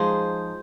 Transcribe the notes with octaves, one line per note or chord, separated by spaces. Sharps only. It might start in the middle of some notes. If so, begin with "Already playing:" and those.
Already playing: F3 G#3 D#4 G#4 C5